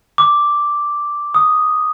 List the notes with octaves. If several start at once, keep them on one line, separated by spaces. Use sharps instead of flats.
D6
D#6